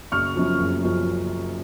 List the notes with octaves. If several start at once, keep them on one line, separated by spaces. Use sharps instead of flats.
F#1 C#6 F6
F#2 F3
F#1
F#2 F3